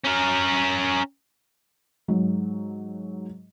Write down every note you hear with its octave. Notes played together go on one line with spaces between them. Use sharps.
C#4 A#4
G#2 F#3